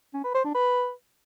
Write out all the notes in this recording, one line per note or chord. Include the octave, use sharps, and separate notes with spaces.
C#4
B4
C5
D4
B4